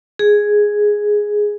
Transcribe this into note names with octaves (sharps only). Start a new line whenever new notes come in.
G#4